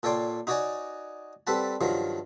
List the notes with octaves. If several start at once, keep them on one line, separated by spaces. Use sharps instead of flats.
A#2 A4 C#5 D5 G5 C6
D#4 F#4 C#5 D5 F#5 G#5
G3 C4 A4 B4 F#5 A5
G2 D#3 F3 F#3